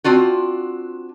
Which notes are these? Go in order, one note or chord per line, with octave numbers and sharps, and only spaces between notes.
C4 D4 F4 F#4